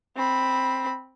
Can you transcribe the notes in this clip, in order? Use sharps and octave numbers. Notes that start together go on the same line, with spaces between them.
C4 B5